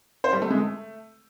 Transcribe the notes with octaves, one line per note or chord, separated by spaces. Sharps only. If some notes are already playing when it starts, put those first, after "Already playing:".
C5
G3
A3
G#3
A3